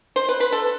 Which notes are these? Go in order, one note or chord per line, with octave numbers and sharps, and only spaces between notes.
C5
B4
B4
A4